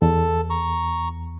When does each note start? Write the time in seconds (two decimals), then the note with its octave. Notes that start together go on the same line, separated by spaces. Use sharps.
0.02 E2 A4
0.50 A#5 C#6